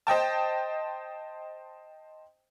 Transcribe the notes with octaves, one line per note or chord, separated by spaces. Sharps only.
C5 D#5 G5 A5